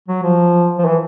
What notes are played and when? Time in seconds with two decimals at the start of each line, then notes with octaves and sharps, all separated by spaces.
0.08 F#3
0.23 F3
0.78 F3
0.85 E3